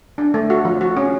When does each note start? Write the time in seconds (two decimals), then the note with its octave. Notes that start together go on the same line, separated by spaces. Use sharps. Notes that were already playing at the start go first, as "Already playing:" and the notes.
0.18 D4
0.34 A3
0.50 F#4
0.65 F3
0.81 F#4
0.97 C#4